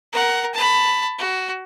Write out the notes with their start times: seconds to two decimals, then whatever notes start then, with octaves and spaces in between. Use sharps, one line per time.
0.13 A#4 F#5
0.54 A5 B5
1.18 F#4